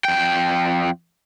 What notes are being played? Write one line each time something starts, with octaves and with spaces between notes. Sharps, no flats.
F2 G5